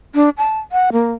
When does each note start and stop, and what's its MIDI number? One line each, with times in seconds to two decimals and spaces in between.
0.15 0.29 62
0.38 0.59 81
0.72 0.90 78
0.93 1.13 58